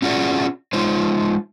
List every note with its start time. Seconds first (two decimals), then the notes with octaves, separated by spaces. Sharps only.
0.02 C#4 F4 F#4 G#4 D5
0.73 G#3 D#4 F4 C5